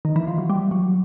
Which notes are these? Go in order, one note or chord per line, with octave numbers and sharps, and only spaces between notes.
D#3
E3
F3
F#3
G3
F#3